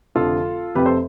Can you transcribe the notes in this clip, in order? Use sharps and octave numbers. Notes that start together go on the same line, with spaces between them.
F1 F2 D3 F3 F4 A4
F1 F2 C3 G4 B4
A4 C5